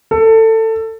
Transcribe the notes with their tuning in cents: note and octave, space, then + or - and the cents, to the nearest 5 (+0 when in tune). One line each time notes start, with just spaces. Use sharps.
A4 +20